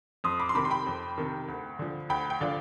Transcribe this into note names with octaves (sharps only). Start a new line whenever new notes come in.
F2 C6 D#6
B5 D6
C6
C3 D#3 B5 D6
C6
G5 B5
F2
C3 D#3
D2
D3 F3
D2 G5 B5
G5
D3 F3 D5 F5